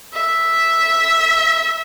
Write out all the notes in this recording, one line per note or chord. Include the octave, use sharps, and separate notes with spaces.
E5